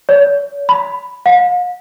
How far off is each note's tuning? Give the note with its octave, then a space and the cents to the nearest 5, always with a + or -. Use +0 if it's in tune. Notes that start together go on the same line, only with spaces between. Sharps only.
C#5 +40
B5 +5
F5 +45